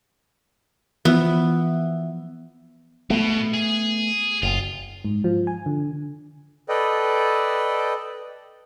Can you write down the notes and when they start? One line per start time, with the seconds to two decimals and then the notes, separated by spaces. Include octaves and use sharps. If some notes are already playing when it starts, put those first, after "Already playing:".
1.05 E3 F3 B3 E5
3.10 B2 A3 B3
3.54 G#4
4.43 F#1 F4
5.05 G#2
5.24 F3
5.47 G#5
5.66 D3
6.69 A4 B4 D5 D#5 G5